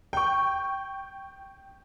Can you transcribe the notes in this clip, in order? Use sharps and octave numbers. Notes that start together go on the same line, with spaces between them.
G5 C#6